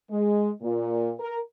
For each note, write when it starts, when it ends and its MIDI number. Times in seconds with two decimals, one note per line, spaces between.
0.11 0.51 56
0.62 1.12 46
1.20 1.39 70